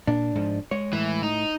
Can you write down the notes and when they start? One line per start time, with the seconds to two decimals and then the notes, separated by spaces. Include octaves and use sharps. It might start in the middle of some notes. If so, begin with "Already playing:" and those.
0.07 A#2 D4
0.35 G#2 F3
0.71 G#3 C#5
0.93 A2 E3
1.23 D#4